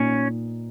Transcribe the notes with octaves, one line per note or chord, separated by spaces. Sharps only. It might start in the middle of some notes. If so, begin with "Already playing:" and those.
Already playing: A#2 C#4 D#4